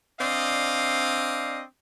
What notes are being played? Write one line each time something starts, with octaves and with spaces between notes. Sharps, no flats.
C4 D4 D5 D#5 F5